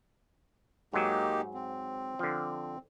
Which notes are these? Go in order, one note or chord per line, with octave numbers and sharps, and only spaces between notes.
G#2 F#3 A#3 D#4 G4
C4
D3 F3